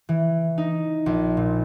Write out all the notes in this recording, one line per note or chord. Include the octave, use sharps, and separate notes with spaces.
E3
D#4
A#1
A#2